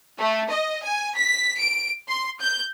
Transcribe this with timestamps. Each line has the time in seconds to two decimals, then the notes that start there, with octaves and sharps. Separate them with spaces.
0.19 A3
0.51 D#5
0.84 G#5
1.17 B6
1.59 D7
2.08 C6
2.40 G6